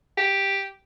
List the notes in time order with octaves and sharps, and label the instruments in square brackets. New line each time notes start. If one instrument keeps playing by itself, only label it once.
[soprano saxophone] G4